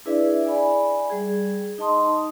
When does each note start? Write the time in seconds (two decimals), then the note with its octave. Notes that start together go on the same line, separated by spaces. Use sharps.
0.05 D4 E4 G#4 B4 D5 E5
0.44 D5 G#5 B5
1.10 G3 G#4
1.78 D#4 D#5 A5 C6 D#6